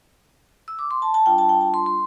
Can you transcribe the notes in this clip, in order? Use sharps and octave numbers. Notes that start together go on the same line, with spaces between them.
E6
D6
C6
A5
A5
G3 D4 F4 G5
A5
G5
A5
C6
C6